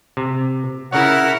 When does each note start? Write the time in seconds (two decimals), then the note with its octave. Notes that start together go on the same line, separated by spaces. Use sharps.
0.17 C3
0.92 C#3 E4 A#4 C#5 F#5